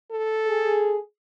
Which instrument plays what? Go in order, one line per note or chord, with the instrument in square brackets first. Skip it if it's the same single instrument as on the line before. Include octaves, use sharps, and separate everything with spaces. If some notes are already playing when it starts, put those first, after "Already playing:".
[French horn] A4
[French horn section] G#4